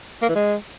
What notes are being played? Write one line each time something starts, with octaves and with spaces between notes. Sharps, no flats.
A#3
E3
G#3